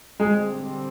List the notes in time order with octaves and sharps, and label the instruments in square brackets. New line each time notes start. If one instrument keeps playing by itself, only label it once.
[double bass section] D3 G3 C4 [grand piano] G#3